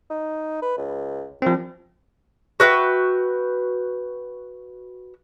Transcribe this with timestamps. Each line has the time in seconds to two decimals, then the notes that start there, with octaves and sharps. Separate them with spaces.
0.10 D#4
0.62 B4
0.77 C#2
1.42 C2 F3 C4
2.60 F#4 B4 E5 G5